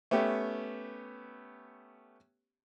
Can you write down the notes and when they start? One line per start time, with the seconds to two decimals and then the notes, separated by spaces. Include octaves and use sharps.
0.11 A3 B3 C#4 G4